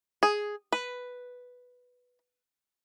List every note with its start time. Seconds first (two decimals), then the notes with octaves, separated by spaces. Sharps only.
0.23 G#4
0.73 B4